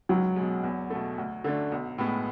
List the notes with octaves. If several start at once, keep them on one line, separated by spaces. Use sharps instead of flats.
C#2 F#3
B2 G#3
E2
B2 A3
D2
D3 A3 D4
B1
A2 G#3 B3